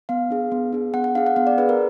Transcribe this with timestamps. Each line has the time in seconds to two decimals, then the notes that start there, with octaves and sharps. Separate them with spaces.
0.09 B3 F5
0.31 D4 G#4
0.52 B3
0.73 D4 G#4
0.94 B3 F#5
1.04 F#5
1.15 D4 G#4 F5
1.26 F#5
1.36 B3 F5
1.47 D5
1.58 D4 G#4 B4
1.69 A#4